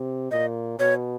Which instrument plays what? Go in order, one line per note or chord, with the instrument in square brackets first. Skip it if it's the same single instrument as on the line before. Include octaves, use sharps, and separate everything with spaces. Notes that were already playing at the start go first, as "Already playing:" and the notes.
Already playing: [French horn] C3
[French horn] A#2 [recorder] D#5
[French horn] B2 [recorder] C#5